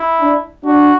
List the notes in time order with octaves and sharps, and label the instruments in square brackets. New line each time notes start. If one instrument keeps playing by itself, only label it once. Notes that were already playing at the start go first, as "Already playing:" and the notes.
Already playing: [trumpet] E4
[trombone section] D4
[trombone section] D4 [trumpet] F#4